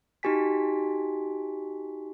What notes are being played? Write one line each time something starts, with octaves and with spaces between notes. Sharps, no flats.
D#4 F#4 G4 G#5 B6